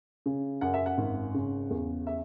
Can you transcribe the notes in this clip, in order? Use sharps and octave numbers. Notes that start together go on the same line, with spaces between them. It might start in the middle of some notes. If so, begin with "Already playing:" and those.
C#3
F#2 F#5
E5
F#5
G#1
C#3
E2
E5